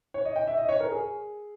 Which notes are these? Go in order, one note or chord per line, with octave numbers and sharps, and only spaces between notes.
C#5
D#5
G5
E5
D#5
C#5
A#4
G#4